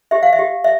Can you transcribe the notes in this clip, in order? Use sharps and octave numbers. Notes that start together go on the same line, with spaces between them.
G4 E5
F5
E5
G4
E5